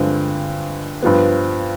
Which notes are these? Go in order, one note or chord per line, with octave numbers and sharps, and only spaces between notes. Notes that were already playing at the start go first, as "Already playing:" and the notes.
Already playing: G2 D3 F3 G#3 C4
G2 F3 B3